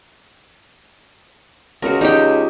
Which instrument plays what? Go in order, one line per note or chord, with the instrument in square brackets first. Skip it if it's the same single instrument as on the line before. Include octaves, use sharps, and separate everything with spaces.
[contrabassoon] C#2 [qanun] F#4 A#4
[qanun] D#4 G4 G5